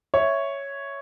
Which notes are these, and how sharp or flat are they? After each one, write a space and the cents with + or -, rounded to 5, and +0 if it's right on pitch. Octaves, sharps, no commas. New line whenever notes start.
C#5 +0 E5 +0